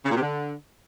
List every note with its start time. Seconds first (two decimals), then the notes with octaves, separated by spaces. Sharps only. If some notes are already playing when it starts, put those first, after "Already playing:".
0.05 C#3
0.11 A#2
0.16 C3
0.21 D3